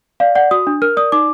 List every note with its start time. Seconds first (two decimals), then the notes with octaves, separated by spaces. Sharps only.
0.20 D5 F5
0.35 D5 F#5
0.51 F#4 D#6
0.67 D4
0.82 A#4 F6
0.97 D5 D#6
1.12 D#4 D6